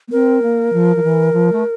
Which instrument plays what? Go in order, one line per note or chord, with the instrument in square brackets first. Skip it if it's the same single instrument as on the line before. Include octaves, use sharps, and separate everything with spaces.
[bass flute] A#3
[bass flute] C4 [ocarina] A#4
[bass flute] A#3
F3
F3
E3
F3
A3